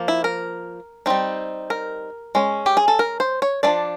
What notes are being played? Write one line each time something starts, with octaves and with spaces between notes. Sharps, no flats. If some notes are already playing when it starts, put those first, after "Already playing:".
Already playing: F3 A#3
E4
A#4
G3 C4 D#4
A#4
G#3 C#4
G4
G#4
A4
A#4
C5
C#5
F3 A3 D4 D5